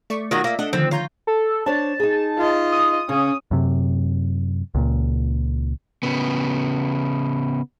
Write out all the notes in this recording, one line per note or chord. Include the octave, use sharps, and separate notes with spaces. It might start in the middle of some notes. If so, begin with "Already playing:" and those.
A3 D5 C#6
D#3 F#3 F4 F#4 D#6
A#3 D5 E5
A3 D4 D#5 F#5
D3 D#3 F3 C4
F4 C#5 A#5 G6
A4
D4 C5 C#5 A5
D#4 G#4
F4 D#5
D#6
C#3 C#4
F#2 C3
C#2 A#2
C#3 B3